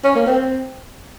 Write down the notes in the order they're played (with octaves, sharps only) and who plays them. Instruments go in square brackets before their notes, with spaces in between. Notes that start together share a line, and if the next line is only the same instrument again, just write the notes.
[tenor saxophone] C#4
A#3
C4